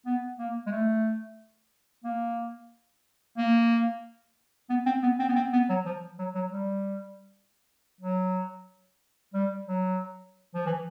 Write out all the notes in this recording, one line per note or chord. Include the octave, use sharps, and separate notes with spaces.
B3
A#3
G#3
A3
A#3
A#3
B3
C4
B3
C4
B3
C4
B3
F#3
F3
F#3
F#3
G3
F#3
G3
F#3
F3
E3